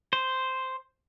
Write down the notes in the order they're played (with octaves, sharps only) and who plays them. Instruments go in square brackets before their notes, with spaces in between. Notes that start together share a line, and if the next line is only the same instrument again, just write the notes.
[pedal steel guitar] C5